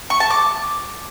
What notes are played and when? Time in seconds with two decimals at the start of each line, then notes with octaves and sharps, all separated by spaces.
0.10 C#6
0.20 A5
0.31 D6